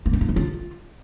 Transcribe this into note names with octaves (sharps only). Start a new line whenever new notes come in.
A#3
D#4
A#3
D#4
F4